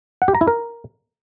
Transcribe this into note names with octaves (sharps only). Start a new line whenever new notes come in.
F#5
G4
A#5
E4
A#4